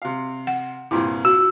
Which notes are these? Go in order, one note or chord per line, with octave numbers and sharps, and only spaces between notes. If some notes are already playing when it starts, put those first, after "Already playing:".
C3 F5
F#5
C2 G2 A#2 E4
F#4 E6